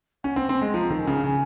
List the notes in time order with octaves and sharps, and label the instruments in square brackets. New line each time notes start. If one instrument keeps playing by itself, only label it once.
[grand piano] C#4 [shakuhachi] F#5
[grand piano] C4
[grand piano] C4 [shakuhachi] G#5
[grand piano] G#3
[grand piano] F3 [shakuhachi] A#5
[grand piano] D#3
[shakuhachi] G#5
[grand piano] C#3
[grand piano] C#3 [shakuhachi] G#5